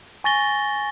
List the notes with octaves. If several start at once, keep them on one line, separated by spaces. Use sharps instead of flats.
G#5 C#6 A6 A#6 G7